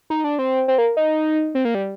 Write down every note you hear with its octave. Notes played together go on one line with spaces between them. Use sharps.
D#4
D4
C4
C4
A#3
D#4
C4
A#3
G3